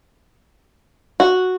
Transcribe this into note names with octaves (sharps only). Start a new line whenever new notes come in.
F#4